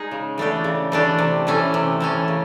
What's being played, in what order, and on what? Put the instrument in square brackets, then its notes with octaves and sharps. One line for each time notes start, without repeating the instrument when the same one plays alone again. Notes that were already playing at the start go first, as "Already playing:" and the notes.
Already playing: [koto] G#3 D#4 G#4
C#3
E3 A3 D4 G4
C#3
E3 A3 D4 G4
C3
E3 A3 C#4
C3
E3 A3 C#4
C#3